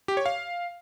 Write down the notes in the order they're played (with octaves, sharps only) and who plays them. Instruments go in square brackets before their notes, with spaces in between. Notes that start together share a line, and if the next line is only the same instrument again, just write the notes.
[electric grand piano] G4
C#5
F5